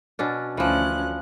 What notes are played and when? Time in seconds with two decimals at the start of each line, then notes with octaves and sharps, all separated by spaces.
0.19 B2 C#4 D4
0.57 D2 E3 F3 C#4 F#6